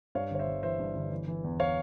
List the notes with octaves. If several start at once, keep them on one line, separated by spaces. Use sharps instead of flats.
G2 C#5 F5
G1 C#5
C5 E5
G1
E3 C5 E5
G2
G1
E3
E3
E2
C#5 F5